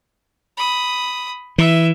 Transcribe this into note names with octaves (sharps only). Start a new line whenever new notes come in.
B5 D#6
E3 E5